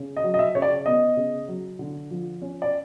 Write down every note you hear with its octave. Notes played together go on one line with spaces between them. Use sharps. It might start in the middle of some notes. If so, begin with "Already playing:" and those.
Already playing: C#3
D#5
F#3
D#5
E5
C#3 C#5
D5
B3 D#5
C#3
F#3
D3
F3
C#4
D5